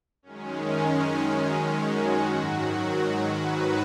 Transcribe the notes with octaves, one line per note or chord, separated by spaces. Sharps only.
F#2 D#3 G#3 C#4
C#4
F#4
G#2 D#3 F#3
B4